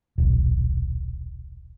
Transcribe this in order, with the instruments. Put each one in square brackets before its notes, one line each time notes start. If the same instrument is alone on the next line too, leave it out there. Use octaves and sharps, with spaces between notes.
[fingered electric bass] D#1 B1